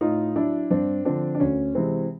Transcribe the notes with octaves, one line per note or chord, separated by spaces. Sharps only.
A2 D#4 F4
F#3 D4 E4
G2 C4 D4
D3 F3 C4 D4
D4
D2 C#4
C3 E3 G#3 C4